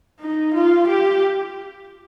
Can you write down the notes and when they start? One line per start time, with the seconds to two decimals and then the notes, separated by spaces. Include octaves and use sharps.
0.20 D#4
0.54 F4
0.87 G4